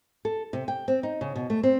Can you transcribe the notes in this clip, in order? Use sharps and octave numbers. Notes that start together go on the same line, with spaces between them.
A4
C3
G5
C4
D#4
C#3
B2
A3
C4